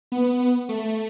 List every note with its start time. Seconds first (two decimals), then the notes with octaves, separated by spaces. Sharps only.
0.12 B3
0.40 B3
0.69 A3